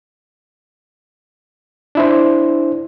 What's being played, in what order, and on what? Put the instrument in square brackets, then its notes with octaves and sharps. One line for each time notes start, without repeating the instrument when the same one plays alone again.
[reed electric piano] D4 E4 C5